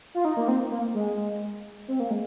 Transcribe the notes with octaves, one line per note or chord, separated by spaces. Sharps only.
F4
D#4
A#3
C4
A#3
G#3
C4
A#3
G#3